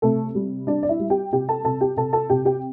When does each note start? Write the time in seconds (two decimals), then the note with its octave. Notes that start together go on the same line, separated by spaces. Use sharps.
0.02 C3 A3 A4
0.35 G3
0.67 G3 D4 D5
0.83 D5
0.89 E4 E5
0.99 G3
1.10 G4 G5
1.32 C3 G4 G5
1.49 A4 A5
1.64 C3 A4 A5
1.81 G4 G5
1.96 C3 A4 A5
2.13 A4 A5
2.29 C3 G4 G5
2.45 G4 G5